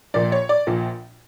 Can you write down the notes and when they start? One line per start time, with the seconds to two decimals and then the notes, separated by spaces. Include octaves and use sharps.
0.14 A#1 A#2 F3 D5
0.32 C#5
0.49 D5
0.67 A#1 A#2 F3